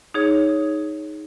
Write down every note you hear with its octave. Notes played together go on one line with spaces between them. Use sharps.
D#4 G#4 C#5